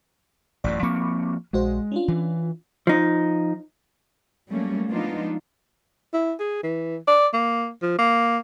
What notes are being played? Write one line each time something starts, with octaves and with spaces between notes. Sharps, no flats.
A1 F#2 A2 D5
F3 A#3 C4 B5 C#6 D6
A#1 G#3 F#4 C5
C#4 D4 F4
E3
F3 D#4
F#3 G3 A3 A#3 C#4
F3 G#3 B3 D4 D#4 F4
E4
G#4
E3
D5
A#3
F3
A#3